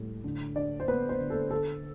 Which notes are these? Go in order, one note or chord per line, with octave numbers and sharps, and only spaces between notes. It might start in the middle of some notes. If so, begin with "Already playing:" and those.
Already playing: A2 G3
D3
D4 D5
C5
B3 B4
C5
D3
A4
D3 A4